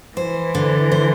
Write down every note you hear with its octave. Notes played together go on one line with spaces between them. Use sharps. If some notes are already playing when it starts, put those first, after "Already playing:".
E3 C5
D3
C5